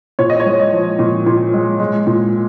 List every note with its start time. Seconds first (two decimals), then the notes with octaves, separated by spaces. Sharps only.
0.19 A#2 C#5
0.30 D#5
0.40 C#5
0.46 G#3
0.59 D#5
0.72 F3
0.99 A#2
1.27 A#2
1.54 G#3
1.80 G#3
2.07 A#2